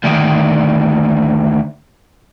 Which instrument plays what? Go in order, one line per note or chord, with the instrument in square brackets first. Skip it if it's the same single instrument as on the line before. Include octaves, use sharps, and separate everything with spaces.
[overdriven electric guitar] D2 D#3